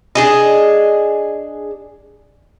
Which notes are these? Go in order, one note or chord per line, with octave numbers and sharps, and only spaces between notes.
D4 G#4 D#5